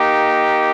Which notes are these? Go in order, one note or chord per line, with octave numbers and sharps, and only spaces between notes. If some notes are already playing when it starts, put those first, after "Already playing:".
Already playing: A#3 D#4 G4